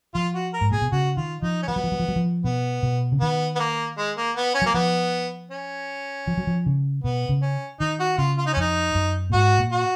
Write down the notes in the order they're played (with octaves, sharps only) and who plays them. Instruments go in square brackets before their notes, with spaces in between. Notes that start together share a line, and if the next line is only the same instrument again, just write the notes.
[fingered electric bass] F3 [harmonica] F4
[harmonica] F#4
A#4
[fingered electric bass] G#2
[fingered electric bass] A#2 [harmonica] G#4
[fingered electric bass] B2
[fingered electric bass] C#3 [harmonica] F#4
[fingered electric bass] D#3 [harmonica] F4
[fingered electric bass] F3 [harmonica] D#4
[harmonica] C#4
[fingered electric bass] F3 [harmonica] B3
[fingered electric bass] F#3
F3
F#3
F3
F#3
F3
[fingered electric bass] B2 [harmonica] B3
[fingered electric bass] B2
C#3
[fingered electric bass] D#3 [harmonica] B3
[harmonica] B3
A#3
G#3
A#3
B3
C#4
[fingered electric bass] F#3 [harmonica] A#3
[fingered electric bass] F3 [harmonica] B3
[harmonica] C#4
[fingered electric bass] F3
F#3
F3
C#3
[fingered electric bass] B2 [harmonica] B3
[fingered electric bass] C#3
[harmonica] C#4
[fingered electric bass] D#3 [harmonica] D#4
[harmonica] F#4
[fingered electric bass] C#3 [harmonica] F4
[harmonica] F4
D#4
C#4
[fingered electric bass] F2 [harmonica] D#4
[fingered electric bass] F#2
A#2
[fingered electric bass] G#2 [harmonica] F#4
[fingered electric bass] A#2
[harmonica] F#4